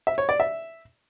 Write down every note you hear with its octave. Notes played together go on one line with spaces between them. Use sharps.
E5
C#5
D5
E5